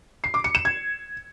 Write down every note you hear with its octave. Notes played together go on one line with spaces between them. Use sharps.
C7
D6
C#7
E7
G#6